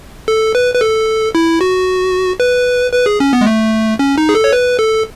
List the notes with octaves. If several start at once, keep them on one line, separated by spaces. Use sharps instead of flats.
A4
B4
B4
A4
E4
F#4
B4
B4
G#4
C#4
B3
G#3
A3
C#4
D#4
G#4
A4
C#5
B4
A4